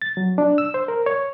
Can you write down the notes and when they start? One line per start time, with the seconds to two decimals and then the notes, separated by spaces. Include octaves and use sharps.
0.02 A6
0.17 F#3
0.38 D4
0.58 E6
0.74 C5
0.88 A#4
1.06 C#5